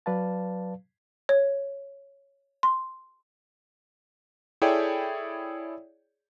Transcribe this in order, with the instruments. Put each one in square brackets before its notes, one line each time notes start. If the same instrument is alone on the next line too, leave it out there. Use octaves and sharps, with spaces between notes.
[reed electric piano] F#3 B4 D5 F5 A5
[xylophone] C#5
C6
[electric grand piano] E4 G#4 A4 C#5 D5 G5